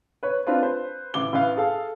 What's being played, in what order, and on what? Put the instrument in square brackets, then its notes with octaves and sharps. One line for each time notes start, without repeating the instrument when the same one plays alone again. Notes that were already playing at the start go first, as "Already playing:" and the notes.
[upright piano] B4 C#5
C4 D4 F4 B4
B4 C5
A1 D6 G7
A1 B4 F5
G#4 A4 F5